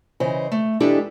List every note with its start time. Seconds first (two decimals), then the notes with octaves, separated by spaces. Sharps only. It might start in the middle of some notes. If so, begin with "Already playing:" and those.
0.20 C#3 E3 C5 D#5
0.52 A3
0.80 E3 G#3 D4 E4 G4 A4